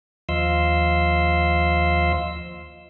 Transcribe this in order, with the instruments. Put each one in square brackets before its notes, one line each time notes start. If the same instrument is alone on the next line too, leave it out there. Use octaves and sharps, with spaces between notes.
[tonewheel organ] D#2 F3 D#5 F5 C6 E6